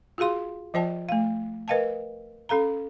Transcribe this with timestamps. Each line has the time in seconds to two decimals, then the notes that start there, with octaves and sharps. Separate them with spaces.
0.18 F4 F#4 G#4 F5 C6
0.74 F3 F4 C5 D5 G5 A5
1.09 A3 F5
1.68 A#4 B4 D#5 F5 G5 A5
2.49 C#4 A4 F5 A#5